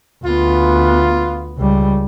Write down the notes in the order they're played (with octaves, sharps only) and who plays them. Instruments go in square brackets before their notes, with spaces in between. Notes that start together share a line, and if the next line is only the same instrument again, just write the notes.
[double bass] D2 B3 [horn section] F4
[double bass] C#2 G3